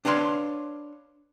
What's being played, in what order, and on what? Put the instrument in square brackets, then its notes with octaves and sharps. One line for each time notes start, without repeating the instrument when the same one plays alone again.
[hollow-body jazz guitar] D4 B4 C#5 F5 C6